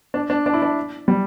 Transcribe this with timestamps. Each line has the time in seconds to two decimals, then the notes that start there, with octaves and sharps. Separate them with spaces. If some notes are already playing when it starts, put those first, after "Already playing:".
0.14 D4
0.30 D4
0.46 D4
0.54 E4
0.62 D4
1.08 G3